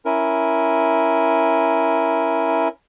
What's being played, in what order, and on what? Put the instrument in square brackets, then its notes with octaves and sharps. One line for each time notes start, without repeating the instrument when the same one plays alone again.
[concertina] C#4 E4 A#4